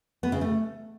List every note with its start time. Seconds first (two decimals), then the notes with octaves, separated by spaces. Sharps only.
0.23 B3
0.32 C#3
0.41 A3